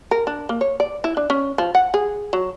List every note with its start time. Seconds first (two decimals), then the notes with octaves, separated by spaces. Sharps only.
0.11 A#4
0.27 D4
0.49 A#3
0.61 C#5
0.80 D5
1.04 E4
1.17 D4
1.30 C#4
1.58 F3
1.75 F#5
1.94 G#4
2.33 F#3